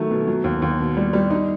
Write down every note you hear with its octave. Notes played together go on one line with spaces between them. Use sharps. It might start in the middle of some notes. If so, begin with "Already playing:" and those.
Already playing: D#3 F#3 A3
B2
F#3
D#2
D#2
B2
G3
G3
D#4